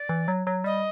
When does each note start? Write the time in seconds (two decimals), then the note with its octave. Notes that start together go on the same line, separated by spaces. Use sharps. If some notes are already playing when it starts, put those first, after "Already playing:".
Already playing: D5
0.09 E3
0.28 F#3
0.47 F#3
0.64 G3 D#5